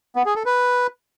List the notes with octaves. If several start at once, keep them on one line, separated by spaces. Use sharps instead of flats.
B3
G#4
A4
B4